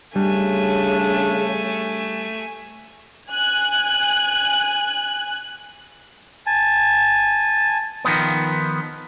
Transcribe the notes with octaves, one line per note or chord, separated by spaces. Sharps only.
C#3 G3 A3 D4 G#5
G#5 F#6
G#5 A5
D#3 F3 B3